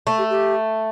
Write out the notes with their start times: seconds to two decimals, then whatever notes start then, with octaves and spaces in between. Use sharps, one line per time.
0.07 A3
0.18 G4
0.30 G4